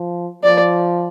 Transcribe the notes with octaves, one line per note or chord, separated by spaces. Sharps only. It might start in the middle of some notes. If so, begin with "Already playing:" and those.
Already playing: F3
F3 D5